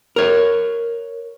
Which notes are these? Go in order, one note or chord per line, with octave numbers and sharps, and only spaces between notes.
A#4 C#5